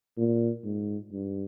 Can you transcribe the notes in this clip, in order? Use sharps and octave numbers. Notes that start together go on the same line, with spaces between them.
A#2
G#2
G2